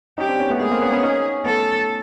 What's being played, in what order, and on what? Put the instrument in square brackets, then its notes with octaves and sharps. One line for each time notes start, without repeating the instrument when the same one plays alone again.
[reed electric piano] C#4 D#4 [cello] G4
[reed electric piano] C4 D4
B3 C#4
A3 B3
[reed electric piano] G#3 A#3 [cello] G#4
[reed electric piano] A#3 C4
B3 C#4
B3 C#4
C#4 D#4
[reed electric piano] A3 B3 [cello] A4